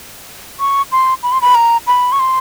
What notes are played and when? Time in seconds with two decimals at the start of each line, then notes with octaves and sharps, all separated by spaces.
0.60 C#6
0.92 C6
1.23 B5
1.32 C6
1.42 B5
1.55 A#5
1.87 B5
2.12 C#6
2.20 C6